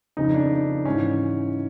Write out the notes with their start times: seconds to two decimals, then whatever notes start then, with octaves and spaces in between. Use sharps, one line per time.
0.17 F2 C#3 F3 D#4
0.34 D4
0.85 G#2 E3 C#4